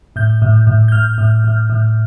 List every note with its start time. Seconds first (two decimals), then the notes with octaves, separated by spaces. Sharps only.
0.16 A2 G6
0.42 A2
0.67 A2
0.88 G6
0.92 A2 F6
1.18 A2
1.44 A2
1.70 A2